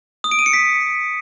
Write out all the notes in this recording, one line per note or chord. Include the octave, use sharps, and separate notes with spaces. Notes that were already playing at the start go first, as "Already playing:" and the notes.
D#6
D7
D#7
C#7
B6